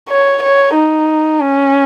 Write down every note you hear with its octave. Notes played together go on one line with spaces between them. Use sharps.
C#5
C#5
D#4
C#4